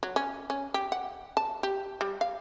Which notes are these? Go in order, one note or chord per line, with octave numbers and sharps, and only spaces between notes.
F#3
C#4
C#4
G4
F#5
A5
G4
G3
F5